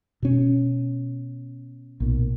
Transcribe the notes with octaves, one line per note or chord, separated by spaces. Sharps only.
B2 C#4
B1 A#2